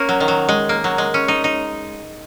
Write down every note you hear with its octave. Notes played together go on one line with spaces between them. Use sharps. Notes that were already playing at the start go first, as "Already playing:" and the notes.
Already playing: A#3 C#4
F#3
D#3
F#3
G#3
A#3
F#3
G#3
C#4
D#4
D#4